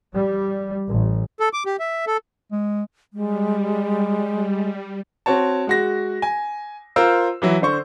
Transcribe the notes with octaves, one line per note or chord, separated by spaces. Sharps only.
G3
A1
A4
D6
G4
E5
A4
G#3
G3 G#3
C4 F#4 C#5 A5
G#3 F#4 A#6
G#5
F4 A#4 C5 E6
E3 F#3 E4
D3 C5 C#6